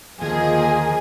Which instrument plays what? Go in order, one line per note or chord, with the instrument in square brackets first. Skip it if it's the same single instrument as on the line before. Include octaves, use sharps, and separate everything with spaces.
[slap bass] D#2 D3 [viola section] F3 A#3 D#5 [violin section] G#4